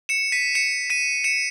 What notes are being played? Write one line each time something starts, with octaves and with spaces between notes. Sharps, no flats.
C#7 E7
B6 D#7
C#7 E7
B6 D#7
C#7 E7